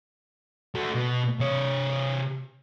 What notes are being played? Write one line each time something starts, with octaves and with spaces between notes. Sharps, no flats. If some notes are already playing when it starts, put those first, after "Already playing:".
A3 F#4
B2
C3 C#5